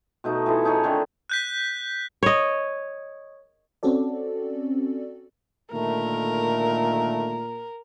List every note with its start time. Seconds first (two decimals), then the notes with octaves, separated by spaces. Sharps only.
0.24 B2 A3 D#4
0.46 E3 E4 F4 A4
0.64 C#4 D#4 G#4 C#5
0.84 D3 D#3 A3 C4
1.30 F#6 G6 B6
2.23 C#5 D#5
3.83 C4 C#4 F#4 A4 D5
5.72 A#2 D3 D#3 A3 A#4